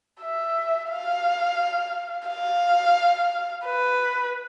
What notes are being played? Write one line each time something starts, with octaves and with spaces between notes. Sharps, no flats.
E5
F5
F5
B4